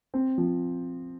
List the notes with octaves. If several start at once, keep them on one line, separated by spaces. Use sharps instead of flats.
C4
F3